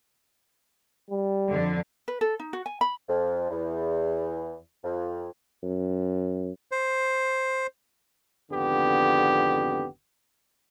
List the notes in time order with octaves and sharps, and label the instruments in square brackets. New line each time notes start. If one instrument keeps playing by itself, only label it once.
[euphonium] G3
[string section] F2 D3
[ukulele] B4
A4
D#4
F#4
G#5
B5
[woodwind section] F2
E2
F2
[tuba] F#2
[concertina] C5
[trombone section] G#1 F2 D3 B3 G4